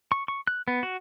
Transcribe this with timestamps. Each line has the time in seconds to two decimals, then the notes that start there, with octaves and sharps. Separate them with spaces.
0.12 C#6
0.28 C#6
0.47 F#6
0.68 B3
0.83 F#4